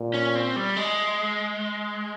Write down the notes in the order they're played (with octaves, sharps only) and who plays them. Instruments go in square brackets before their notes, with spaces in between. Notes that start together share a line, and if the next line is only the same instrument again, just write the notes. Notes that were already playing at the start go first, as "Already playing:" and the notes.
Already playing: [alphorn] A#2
[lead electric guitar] C#4
C4
G3
G#3